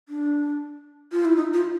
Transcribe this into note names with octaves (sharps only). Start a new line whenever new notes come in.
D4
F4
E4
D#4
F4